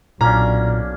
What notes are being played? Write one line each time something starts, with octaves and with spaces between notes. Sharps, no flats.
B1 A#2 A#3 C#4 D4 A#5